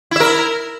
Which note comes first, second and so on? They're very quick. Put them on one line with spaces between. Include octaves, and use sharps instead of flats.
E4 E5 A#4